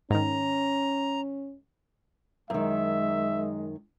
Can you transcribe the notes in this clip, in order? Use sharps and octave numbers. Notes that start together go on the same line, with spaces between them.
G#2 D#3 C#4 A#5
F#2 D#3 G#3 E5